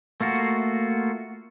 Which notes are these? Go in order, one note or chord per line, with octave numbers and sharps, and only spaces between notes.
A3 A#3 F4 F#4